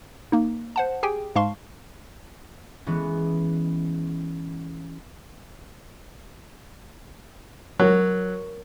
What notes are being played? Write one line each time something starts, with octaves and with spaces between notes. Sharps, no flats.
A#3 D#4
C5 F#5 A5
G4 G#4 G5 G#5
G#2 G#3 F5 A5 C6 C#6
E3 G#3 B3 C#4
F#3 A#4 C#5